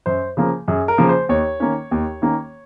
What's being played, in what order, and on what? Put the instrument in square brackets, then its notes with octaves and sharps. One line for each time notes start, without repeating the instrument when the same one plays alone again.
[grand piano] F#2 C5
C#3 F3 A#3
F#2 G#4
A#4
C#3 F3 A#3
C5
D#2 C#5
D#3 A#3 C#4
D#2
D#3 A#3 C#4